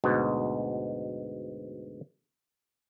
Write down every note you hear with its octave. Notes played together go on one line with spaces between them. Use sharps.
D2 G#2 B2